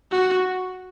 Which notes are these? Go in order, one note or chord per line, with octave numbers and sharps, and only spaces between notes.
F#4